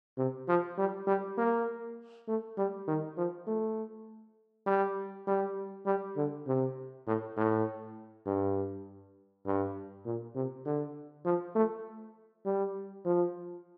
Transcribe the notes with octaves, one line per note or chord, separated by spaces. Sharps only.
C3
F3
G3
G3
A#3
A3
G3
D#3
F3
A3
G3
G3
G3
D3
C3
A2
A2
G2
G2
A#2
C3
D3
F3
A3
G3
F3